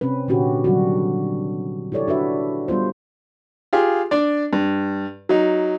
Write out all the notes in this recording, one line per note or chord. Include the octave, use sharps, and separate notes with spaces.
C3 C4 C#4 B4
A#2 D3 C#4 F#4 G4
D3 D#3 F#3 G3 D4 F#4
E4 G4 A4 C#5 D5
D4 F#4 B4 E5
G3 B3 F4 C5
F4 G4 G#4
D4 D5
G2
F#3 D#4